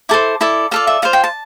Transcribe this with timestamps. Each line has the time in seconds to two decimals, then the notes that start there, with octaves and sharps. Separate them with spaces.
0.09 E4 A4 C5 D6
0.41 E4 A4 D5
0.71 F4 A4 D5 F5
0.87 E5
1.02 F4 C5 F5
1.13 G5
1.24 A5